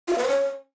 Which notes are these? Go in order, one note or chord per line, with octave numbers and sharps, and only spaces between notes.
F4
F5
B4
C5
C#5